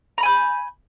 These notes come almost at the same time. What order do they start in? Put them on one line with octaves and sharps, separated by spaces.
A#5 B5 G#5 G6